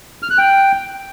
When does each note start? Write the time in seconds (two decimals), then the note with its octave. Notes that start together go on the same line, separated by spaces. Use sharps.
0.23 F6
0.30 F#6
0.38 G5